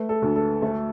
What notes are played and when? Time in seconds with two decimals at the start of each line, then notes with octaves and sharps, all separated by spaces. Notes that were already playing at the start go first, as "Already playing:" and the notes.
Already playing: A3 B4
0.09 A4
0.22 D2
0.36 A4
0.62 A3